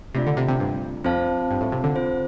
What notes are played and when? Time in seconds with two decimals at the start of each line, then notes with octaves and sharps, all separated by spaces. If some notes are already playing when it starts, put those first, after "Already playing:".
0.15 C3 A3 D4 F4 D5
0.27 D3
0.37 C3
0.48 C3
0.60 G2
1.04 F2 C4 F4 C5 F5 A5
1.51 G2
1.61 A2
1.72 C3
1.84 D3
1.95 C4 F4 C5